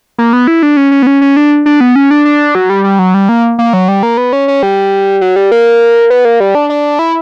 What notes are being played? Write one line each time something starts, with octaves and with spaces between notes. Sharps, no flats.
A#3
B3
E4
D4
C#4
C#4
B3
C#4
C#4
D4
D4
B3
C#4
D4
D4
F#3
G3
G3
F#3
G3
A#3
A#3
F#3
G3
A#3
B3
C#4
C#4
G3
F#3
G3
A#3
B3
A#3
G3
D4
D4
E4